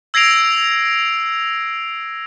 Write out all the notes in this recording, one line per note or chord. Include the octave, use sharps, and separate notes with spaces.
E6 G#6 A#6 C7 D7 F7